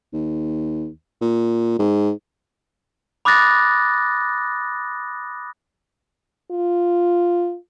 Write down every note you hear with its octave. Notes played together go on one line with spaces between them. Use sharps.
D#2
A#2
G#2
B5 D6 D#6 F#6 A6 A#6
F4